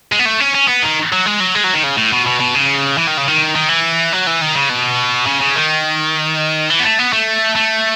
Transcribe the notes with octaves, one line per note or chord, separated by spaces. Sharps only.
G#3
B3
A3
C#4
C#4
B3
D#3
F#3
G#3
F#3
G#3
F#3
D#3
C#3
A2
B2
B2
B2
C#3
E3
D#3
C#3
D#3
D#3
E3
F#3
E3
D#3
C#3
B2
C#3
C#3
D#3
E3
B3
A3
B3
A3
A3